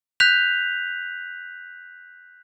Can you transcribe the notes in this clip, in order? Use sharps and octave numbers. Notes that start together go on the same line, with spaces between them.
F#6 G6 B6 F7